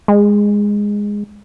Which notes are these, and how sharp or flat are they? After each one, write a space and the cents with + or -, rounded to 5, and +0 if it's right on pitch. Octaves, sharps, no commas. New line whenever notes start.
G#3 -10